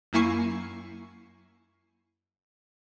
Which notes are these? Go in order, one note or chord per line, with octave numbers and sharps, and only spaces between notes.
F#2 A#3 E4 G#5 C#6 C7